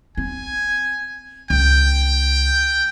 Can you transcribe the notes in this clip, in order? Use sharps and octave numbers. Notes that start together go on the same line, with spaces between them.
C4 G#5
C#2 G5